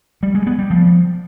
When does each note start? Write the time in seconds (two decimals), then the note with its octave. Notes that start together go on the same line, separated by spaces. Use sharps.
0.23 G3
0.35 G#3
0.47 B3
0.59 G3
0.70 F3